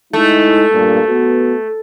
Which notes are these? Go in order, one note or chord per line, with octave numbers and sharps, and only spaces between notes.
G#3 A3 D#4 E4
G2 A#2
B3 F#4